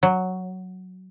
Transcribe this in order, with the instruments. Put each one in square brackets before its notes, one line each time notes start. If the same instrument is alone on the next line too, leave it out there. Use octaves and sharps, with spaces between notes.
[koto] F#3